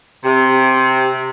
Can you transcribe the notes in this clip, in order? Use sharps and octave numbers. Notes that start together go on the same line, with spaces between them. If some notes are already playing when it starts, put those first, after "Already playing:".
C3